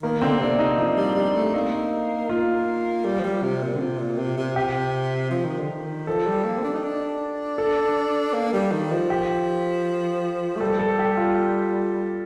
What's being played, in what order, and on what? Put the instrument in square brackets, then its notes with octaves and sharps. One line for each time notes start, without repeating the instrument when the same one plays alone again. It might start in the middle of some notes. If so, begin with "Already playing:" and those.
[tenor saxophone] D#3 [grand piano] A#3
[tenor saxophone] D3 [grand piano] C4
[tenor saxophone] C3 [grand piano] D4
[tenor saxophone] C3 [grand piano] D#4
[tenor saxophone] F3 [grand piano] D#4
[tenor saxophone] G3
[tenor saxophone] G3 [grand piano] D4
[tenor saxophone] A3
[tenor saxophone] A#3 [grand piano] D#4
[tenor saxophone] A#3 [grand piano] F4
[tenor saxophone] G3
F3
G3
C3
A#2
D3
C3
A#2
C3
C3
[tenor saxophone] C3 [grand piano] G4
[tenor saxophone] F3
D#3
D3
D#3
[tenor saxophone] F3 [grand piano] A4
[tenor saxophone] G3
A#3
C4
D4
D#4
D4
[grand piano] A4
[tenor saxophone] A#3
G3
D#3
F3
[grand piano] G4
[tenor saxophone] A3
[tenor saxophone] G3 [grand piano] A4
[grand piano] A4
G4
F4